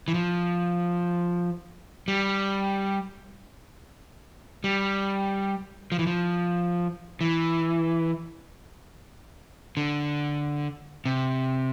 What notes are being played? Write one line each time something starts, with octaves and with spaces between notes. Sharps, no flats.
E3
F3
G3
G3
F3
E3
F3
E3
D3
C3